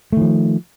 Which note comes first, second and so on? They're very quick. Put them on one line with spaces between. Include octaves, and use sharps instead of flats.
A3 D#3 F3